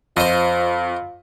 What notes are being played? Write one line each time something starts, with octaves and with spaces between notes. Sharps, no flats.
F2 F4 C5 D#5